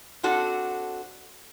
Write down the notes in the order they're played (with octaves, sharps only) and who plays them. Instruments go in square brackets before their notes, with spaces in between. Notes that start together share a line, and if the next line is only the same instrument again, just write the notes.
[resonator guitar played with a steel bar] C4 D4 F#4 A4